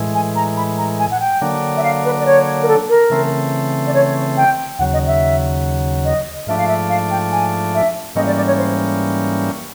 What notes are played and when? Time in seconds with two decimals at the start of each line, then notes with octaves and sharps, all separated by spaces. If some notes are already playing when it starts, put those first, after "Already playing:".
Already playing: A2 E3 G#3
0.14 G#5
0.36 A#5
0.57 B5
0.78 A#5
0.99 G#5
1.11 F#5
1.20 G5
1.41 D3 F#3 A#3 D4
1.77 E5
1.83 F5
2.05 B4
2.20 D5
2.26 C#5
2.63 A#4
2.68 A4
2.89 A#4
3.10 C#3 E3 A3 C4
3.87 D5
3.94 C#5
4.37 G5
4.79 D#2 C#3 F#3 F#5
4.93 D#5
5.07 E5
6.05 D#5
6.47 G#2 F3 A3 D4 E5
6.58 F5
6.67 E5
6.89 F5
7.10 G5
7.32 G#5
7.74 E5
8.15 G#2 E3 G3 A#3 C#4 D#5
8.27 D5
8.37 D5
8.47 C#5
8.57 C5